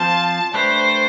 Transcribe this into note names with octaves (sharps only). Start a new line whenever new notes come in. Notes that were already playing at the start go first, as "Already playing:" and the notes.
Already playing: F3 C4 F4 C5 A5
A3 D4 G4 B4 C5